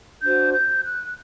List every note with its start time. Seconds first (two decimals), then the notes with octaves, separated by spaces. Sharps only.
0.23 D4 F#4 C5 G6
0.53 G6
0.82 F#6